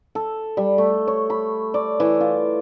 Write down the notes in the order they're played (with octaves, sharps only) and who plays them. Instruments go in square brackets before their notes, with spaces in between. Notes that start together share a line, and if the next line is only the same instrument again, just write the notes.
[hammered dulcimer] A4
G3
A3
C#5
B5
D5
E3
F4